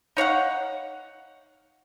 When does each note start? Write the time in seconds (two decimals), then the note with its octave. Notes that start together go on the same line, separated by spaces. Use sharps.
0.17 D#4 C#5 F5 F#5